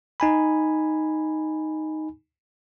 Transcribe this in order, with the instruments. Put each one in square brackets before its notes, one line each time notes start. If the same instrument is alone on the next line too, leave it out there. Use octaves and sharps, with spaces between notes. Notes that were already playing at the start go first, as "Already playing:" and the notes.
[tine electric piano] D#4 G#5 B5